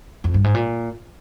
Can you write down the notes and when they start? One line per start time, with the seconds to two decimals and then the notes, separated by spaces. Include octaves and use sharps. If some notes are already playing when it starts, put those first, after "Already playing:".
0.24 F2
0.34 G2
0.44 G#2
0.55 A#2